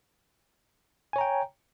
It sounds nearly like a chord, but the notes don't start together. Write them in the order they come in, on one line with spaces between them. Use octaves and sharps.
G#5 C#5 A#5 G5